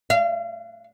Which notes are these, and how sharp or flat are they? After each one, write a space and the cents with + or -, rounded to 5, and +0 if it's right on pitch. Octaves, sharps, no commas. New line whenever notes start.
F5 -35